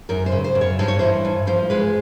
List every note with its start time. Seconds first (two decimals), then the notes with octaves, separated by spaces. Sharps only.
0.09 F#2 A#4
0.26 C5
0.32 C#3
0.44 C5
0.55 F#2
0.61 C#5
0.79 G2 C5
0.88 C#5
0.99 E3 C5
1.25 G2
1.47 F3 C5
1.70 G#3 B4